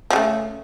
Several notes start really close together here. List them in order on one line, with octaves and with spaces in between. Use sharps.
F3 C#3 A3